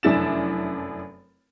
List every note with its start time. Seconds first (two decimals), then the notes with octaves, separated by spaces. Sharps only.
0.03 F1 F#2 D4 E4 A6 E7